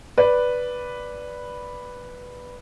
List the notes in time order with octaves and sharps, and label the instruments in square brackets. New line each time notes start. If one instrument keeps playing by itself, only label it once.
[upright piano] B4 D5